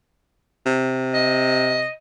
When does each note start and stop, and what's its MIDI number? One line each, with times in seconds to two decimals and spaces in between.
0.66 1.88 48
1.14 1.91 75